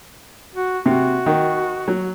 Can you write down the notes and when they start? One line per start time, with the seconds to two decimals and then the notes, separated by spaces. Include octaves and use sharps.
0.55 F#4
0.86 C3 F#4
1.26 D#3
1.88 F#3